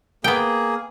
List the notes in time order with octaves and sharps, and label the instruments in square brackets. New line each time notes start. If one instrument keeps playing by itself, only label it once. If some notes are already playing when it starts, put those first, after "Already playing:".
[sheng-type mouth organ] A#3 G#4 [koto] B3 G5